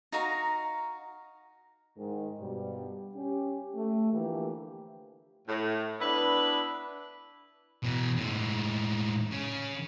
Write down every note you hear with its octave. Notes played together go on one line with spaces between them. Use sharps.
D#4 F#4 F5 A#5
G#2 D#3
G2 B2 G3
C#4 G4
A3
D3 E3 F3 A3 A#3 G4
A2
B3 D4 E4 B4
B2 E3
A2 G#3
C#3